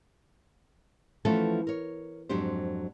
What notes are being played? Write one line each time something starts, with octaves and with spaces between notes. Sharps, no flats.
E3 F3 A3 B3 C#4 A4
A#4 C#5
F2 G#2 F#3 D4 G4 C5